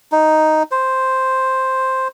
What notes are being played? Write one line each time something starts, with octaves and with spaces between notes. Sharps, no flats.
D#4
C5